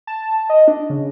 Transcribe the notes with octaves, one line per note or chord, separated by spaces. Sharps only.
A5
D#5
D4
C#3